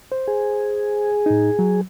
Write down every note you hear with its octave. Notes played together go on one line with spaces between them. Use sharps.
C5
G#4
A2 D#4
F#3